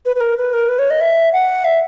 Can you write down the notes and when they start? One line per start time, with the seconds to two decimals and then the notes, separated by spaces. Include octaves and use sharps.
0.06 B4
0.16 B4
0.20 A#4
0.37 B4
0.53 A#4
0.69 B4
0.79 C#5
0.90 D#5
1.01 E5
1.33 F#5
1.64 E5